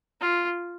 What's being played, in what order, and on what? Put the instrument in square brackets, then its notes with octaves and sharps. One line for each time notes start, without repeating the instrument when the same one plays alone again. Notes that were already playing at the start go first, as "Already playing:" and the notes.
[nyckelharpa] F4